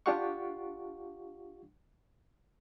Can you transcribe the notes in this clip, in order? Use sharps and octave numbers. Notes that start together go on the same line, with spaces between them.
D4 F4 G4 F5 F#5 C#6